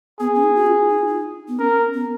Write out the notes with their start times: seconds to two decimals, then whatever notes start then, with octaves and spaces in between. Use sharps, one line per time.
0.20 B3 G#4
0.35 C#4
0.44 D#4
0.56 F#4
0.67 F4
0.90 D#4
0.98 F4
1.07 D#4
1.48 B3
1.59 C#4 A#4
1.94 B3